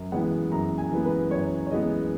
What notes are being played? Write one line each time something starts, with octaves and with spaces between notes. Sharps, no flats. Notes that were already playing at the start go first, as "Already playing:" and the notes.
Already playing: F#2
E3 G#3 B3 F#5
F#2 A#5
G#5
E3 G#3 B3
B4
F#2 C#5
C#5
E3 G#3 B3 D#5